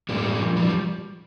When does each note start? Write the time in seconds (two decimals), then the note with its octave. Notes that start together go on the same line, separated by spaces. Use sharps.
0.09 A2 E3 G3 A#3
0.40 A#2 F3
0.56 E3 G3
0.67 F3